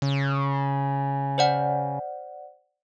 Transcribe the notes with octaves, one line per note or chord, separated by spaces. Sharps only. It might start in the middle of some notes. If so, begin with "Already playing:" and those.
C#3
C5 D5 F#5